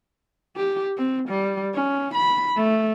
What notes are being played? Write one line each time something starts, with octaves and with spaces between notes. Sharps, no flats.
G4
C4
G3
C#4
B5
A3